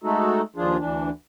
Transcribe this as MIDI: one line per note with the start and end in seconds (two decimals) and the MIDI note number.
0.04 0.41 56
0.04 0.41 57
0.04 0.41 63
0.04 0.41 66
0.04 0.41 69
0.56 0.77 39
0.56 0.77 53
0.56 0.77 62
0.56 0.77 65
0.56 0.77 68
0.79 1.10 38
0.79 1.10 52
0.79 1.10 62